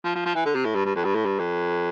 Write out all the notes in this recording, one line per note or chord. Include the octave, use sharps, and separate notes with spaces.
F3
F3
F3
E3
D3
C3
A2
G2
G2
F2
G2
A2
G2
F2